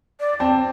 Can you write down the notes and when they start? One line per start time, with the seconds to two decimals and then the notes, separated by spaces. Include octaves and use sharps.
0.20 D5
0.40 C4 A5